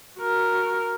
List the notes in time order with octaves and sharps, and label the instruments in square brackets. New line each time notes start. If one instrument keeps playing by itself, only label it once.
[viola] F#4 A#4